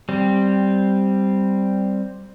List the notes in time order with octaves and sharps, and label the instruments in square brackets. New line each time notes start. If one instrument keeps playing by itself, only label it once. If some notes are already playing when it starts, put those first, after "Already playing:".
[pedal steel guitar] G3 C4